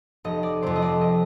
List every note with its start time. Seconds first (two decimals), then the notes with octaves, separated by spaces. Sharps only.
0.24 F1 D#5
0.43 D5
0.62 F2 C3 C5
0.76 D#5
0.82 D5
1.01 D#5